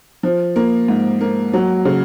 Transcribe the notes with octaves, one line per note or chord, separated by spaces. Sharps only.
F3
A#3
G#2
A#3
F#3
C#3